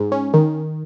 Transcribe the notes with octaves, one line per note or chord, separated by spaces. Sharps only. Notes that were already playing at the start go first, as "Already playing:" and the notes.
Already playing: G#2
C#4
D#3